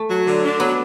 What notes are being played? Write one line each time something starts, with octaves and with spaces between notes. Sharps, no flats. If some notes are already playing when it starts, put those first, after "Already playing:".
Already playing: A3
F#3
D3
D4
F#3 B3